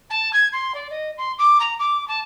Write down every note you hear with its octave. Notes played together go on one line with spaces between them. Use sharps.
A5
G#6
C6
D5
D#5
C6
D6
A#5
D6
A5